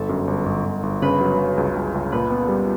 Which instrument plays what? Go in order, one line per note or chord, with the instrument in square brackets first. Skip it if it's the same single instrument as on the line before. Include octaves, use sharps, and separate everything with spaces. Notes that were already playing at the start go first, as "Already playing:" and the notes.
Already playing: [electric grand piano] G1 [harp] A4
[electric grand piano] F#2
G1
G1
G1
G1
[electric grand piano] C#3 [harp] B4
[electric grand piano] F#3
F#3
C#2
C#2
C#2
[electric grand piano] A#2 [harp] B4
[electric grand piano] B3
G3